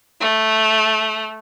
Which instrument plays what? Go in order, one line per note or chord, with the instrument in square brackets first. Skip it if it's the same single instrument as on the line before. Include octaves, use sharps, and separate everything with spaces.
[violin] A3